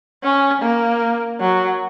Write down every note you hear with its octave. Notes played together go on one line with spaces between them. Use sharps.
C#4
A#3
F#3